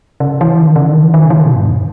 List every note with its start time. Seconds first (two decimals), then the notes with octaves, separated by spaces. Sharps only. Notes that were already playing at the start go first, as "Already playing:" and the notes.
0.20 C#3
0.41 E3
0.62 D#3
0.76 C#3
0.90 D#3
1.03 E3
1.14 D#3
1.24 C#3
1.30 E3
1.35 D#3
1.45 B2
1.56 G2
1.66 E2